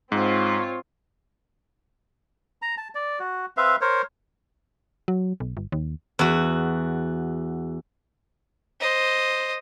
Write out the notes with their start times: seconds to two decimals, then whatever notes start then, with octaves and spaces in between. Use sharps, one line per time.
0.12 G#2 C4 F4 C#5
2.62 A#5
2.77 A5
2.95 D5
3.19 F#4
3.57 C4 B4 E5 F5
3.81 A#4 C5 C#5
5.08 F#3
5.40 B1
5.57 G1
5.72 D#2
6.19 E2 F#4
8.80 C5 D#5